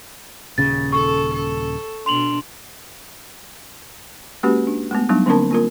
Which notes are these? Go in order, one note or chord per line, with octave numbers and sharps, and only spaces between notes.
D#1 C#3 A6
A4 C#6
A4
B2 D4 C6 F7 F#7
G#3 A#3 C#4 F#4 G4 B4
D4
G#3 A3 B3
F#3 G3 B3 D4 D#4
D3 A#3 C4 D4 A#4 A5
A#3 F4 A#4